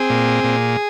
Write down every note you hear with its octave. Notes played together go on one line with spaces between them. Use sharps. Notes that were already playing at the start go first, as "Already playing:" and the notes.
Already playing: C4 G#4
A#2
A#2